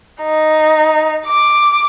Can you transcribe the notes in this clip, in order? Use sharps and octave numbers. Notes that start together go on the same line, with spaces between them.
D#4
D6